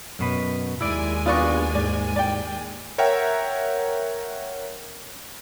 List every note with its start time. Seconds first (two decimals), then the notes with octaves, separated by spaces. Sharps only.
0.19 F#2 B2 B4
0.81 D#2 G#3 E4 D5 G#5
1.26 B3 D4 F4 F#4 D5 C#6
1.75 G#2 D5
2.16 D5 G5
2.98 A#4 C#5 E5 F#5 G5 A#5